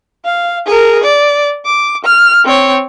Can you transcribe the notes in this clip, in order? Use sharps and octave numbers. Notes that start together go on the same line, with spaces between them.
F5
G#4 A#4
D5
D6
F6
C4 C#5